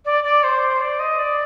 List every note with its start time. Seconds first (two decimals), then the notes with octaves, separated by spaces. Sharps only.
0.05 D5
0.24 D5
0.43 C5
0.81 D5
0.99 D#5
1.19 D5